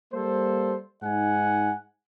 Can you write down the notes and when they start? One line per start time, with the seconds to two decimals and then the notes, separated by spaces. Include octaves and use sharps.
0.13 G3 A#3 A4 C5
1.03 G#2 D#4 F#5 G#5